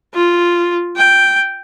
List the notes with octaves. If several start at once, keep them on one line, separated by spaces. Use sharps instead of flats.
F4
G5